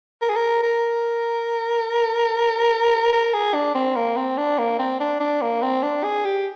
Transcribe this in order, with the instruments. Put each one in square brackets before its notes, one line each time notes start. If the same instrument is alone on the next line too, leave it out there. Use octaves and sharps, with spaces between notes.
[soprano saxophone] A#4
G#4
A#4
A#4
A#4
G#4
D4
C4
A#3
C4
D4
A#3
C4
D4
D4
A#3
C4
D4
G#4
G4